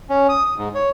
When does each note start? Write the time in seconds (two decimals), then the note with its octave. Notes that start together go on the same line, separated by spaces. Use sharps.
0.10 C#4
0.29 D#6
0.45 D#6
0.57 G#2
0.75 C#5